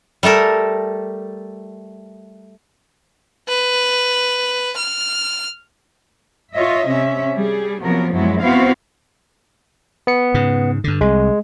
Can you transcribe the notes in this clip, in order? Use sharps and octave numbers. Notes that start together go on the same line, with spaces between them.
G3 A3 A4 A#4
B4
F6
F4 C#5 D#5 E5
C3 C#4 E5
G3 G#4
C3 F3 F#3 A#3 B3 A#4
F#2 F#3 G#3 B3 E4
B3 C4 E4 F#4 C5 F5
B3 C#7
G#2 C#3
G2 D3
C2 G#3